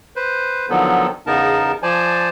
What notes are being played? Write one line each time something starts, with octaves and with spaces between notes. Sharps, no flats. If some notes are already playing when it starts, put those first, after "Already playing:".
B4 C5
D3 D#3 F3 F#3 B3 A4
E2 C#3 B3 D#4 A#4 A5
F3 C5 D5 G#5 A5